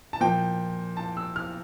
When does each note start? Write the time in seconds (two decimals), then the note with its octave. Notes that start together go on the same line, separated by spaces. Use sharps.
0.13 A5
0.21 A#2 F3 G5
0.97 A5
1.17 E6
1.36 F6